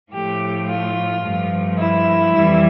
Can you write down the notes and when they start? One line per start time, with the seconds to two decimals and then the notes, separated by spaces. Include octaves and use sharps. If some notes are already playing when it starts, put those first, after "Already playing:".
0.12 A2 F3 A3 G4
0.68 F4
1.22 G2 F3 A3
1.77 E4
2.32 F2 E3 G3